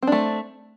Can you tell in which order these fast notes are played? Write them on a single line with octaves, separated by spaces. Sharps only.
C4 D4 A3